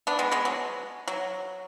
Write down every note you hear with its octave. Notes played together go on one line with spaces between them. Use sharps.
B3 D4
G#3 B3
G#3 B3
F#3
F#3